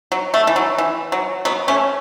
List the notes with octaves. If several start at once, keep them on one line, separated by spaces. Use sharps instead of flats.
F#3
A3
E3
F#3
E3
F#3
F#3 B3
A3 C#4